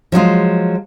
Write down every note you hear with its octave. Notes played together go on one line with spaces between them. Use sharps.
F3 F#3 G#3 F4